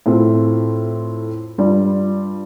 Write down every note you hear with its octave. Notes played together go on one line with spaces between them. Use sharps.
A2 A3 C4 F4
G2 G3 F4 D5